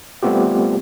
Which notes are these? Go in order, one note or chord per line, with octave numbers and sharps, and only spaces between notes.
G3 A3 B3 C4 F4 G4